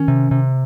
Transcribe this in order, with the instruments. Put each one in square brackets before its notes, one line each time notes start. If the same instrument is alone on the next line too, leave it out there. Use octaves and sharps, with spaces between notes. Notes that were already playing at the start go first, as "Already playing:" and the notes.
Already playing: [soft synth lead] D#3 [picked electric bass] C#4
[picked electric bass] C3
C3